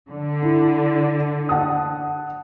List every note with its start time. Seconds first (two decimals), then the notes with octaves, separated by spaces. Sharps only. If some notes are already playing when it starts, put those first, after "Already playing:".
0.10 D3
0.42 E4
1.49 F#5 A5 D#6